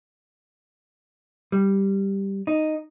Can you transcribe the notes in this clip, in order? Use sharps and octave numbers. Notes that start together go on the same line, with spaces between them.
G3
D#4